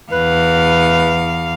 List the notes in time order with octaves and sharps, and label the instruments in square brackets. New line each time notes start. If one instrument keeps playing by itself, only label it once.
[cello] E2 F5 [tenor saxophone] B4